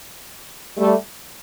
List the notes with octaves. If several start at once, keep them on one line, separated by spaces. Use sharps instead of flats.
G3 A3